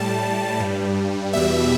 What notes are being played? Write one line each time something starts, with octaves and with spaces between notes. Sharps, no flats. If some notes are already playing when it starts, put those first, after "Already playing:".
Already playing: A2 G3 A5
G2 G3
E2 B2 G3 E5